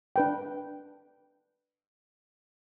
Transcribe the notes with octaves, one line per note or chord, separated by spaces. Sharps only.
D4 B4 G5